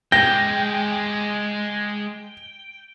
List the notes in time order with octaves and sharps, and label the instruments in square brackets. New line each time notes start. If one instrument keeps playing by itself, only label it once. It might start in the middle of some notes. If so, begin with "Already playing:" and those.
[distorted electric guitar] G#3 G4 [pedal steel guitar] G5 [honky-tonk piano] A#6